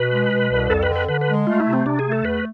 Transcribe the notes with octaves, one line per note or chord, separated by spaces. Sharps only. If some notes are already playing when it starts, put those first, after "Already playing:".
Already playing: B2 B4
G#3
B2
C2
F2 A4
B4
D3
B4
D3 B4
B4
G#3
A3 F4
E4
C3
C4
C3 D4
G#4
A3
A4
E2 B4